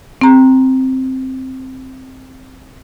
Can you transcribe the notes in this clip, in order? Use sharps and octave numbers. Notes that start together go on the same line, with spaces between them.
C4 A#5